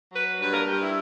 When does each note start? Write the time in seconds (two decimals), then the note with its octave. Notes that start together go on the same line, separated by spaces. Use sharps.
0.13 F#3 B4
0.40 G2 B4
0.53 A#4
0.66 G2 G4
0.80 E4